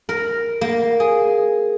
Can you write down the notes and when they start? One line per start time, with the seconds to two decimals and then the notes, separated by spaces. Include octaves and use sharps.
0.09 A#4
0.61 A#3
1.00 G#4